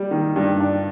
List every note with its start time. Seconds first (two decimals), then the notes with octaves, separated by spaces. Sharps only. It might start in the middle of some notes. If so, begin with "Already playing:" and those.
Already playing: G3
0.11 D#3
0.36 G2
0.61 D4